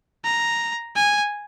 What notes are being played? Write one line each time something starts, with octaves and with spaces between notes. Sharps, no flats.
A#5
G#5